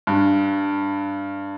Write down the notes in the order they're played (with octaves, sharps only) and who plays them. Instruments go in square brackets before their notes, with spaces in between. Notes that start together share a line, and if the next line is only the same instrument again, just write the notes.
[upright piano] G2